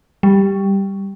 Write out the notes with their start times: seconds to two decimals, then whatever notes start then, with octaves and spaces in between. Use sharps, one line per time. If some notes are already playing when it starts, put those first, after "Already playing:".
0.23 G3